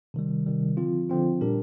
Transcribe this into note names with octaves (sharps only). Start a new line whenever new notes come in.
C3 D#3 G3
C3 D#3 G3
D3 F3 C4 F4
D3 F3 C4 F4
A#2 G3 D4 G4 A#4